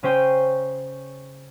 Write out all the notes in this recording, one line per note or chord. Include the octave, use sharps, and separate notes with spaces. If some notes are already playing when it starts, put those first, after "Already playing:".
C#3 C#4 C5 G5 D#7